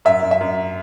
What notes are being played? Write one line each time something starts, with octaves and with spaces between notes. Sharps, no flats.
F#2 E5
F#2
E5
F#2